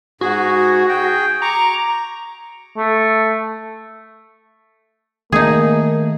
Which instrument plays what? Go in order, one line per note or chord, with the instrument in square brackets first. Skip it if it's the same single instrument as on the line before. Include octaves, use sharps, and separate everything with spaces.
[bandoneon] G#2 G#4 [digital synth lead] F#4
[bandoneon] G#4 G5
[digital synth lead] A#5 [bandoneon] C#6 D6
[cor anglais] A3
[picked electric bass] D#3 A3 [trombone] A#3 [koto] D#4 G#4